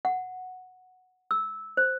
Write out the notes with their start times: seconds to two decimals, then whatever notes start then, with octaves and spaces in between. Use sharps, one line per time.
0.05 F#5
1.31 E6
1.77 C5